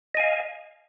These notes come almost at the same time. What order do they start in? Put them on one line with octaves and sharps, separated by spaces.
D#5 G#5 F5